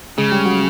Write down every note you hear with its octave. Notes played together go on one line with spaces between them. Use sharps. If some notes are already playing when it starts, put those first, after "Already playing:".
C#3 G#3 G#4
G3 G4
F#3 F#4